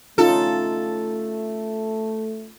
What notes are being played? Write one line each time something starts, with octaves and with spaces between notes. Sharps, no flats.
A3 C#4 D#4 F4 A4